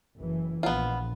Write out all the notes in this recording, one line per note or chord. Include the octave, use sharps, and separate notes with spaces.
F#1 E3
A#1 B3 F4